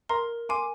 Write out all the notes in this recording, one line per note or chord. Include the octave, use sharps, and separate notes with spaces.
A#4 A#5 C6
G#5 C6 D6